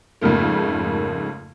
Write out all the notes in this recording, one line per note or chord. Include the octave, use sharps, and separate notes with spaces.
F2 G#2 C#3 A3 A#3